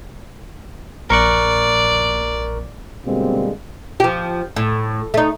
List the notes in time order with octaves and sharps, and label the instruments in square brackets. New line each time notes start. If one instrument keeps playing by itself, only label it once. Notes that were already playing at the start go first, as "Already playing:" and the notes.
[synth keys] A#1 [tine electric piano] A#4 C#6 F#6 [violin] D5
[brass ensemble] B2 D3 G3 G#3 A#3 C4
[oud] F3 G4
A2
A3 D#4